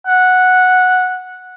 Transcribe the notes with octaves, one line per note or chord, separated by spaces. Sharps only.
F#5